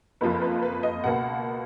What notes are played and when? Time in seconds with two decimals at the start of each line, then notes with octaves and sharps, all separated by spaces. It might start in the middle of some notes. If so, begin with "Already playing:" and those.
0.21 F#1 F2 F3 A#3 B4
0.41 B4
0.62 B4
0.83 D#5
1.04 C#2 B2 A#3 F#5